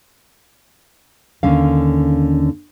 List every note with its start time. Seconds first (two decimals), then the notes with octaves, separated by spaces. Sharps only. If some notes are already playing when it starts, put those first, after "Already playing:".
1.43 D#2 D3 C#4 F5